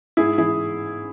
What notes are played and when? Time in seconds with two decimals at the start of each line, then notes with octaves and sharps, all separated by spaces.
0.17 G#2 E4 G#4
0.38 E3 E4 G#4